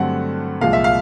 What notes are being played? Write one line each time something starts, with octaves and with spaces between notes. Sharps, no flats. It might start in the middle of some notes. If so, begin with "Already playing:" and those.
Already playing: G2 D3 F#3 A3 C4 F#5
C2 A#2 F3 G#3 F5
E5
F5